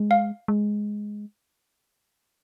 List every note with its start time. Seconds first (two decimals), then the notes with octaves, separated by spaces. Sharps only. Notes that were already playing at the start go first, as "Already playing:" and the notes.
Already playing: G#3
0.11 F5
0.48 G#3